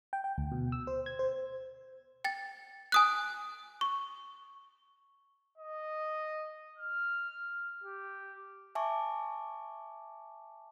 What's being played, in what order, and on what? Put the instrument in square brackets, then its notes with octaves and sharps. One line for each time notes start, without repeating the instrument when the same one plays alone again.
[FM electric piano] G5
G5
D2
B2
E6
C5
G#6
C5
[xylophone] G5 A6
G#5 D#6 F#6
C#6
[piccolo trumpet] D#5
F6
G4
[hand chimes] E5 G#5 A5 C#6 D6